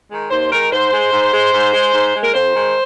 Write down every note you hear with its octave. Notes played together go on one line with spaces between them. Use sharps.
D#3 G#3
D#2 C5
D#3 G#3 A#4
G#2 C5
G#3
G#2
G#3
G#2
G#3
G#2
G#3
A#4
F2 C5
D#3 G#3